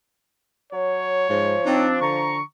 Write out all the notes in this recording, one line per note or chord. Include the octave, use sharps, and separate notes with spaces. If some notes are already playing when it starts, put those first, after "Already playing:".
F#3 C#5
G#2 F3
C4 D4 D#4
D3 A#5 C#6